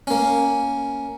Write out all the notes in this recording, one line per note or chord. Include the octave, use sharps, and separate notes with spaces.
A#3 C#4